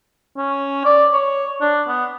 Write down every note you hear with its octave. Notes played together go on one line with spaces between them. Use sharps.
C#4
D5
C#5
D4
B3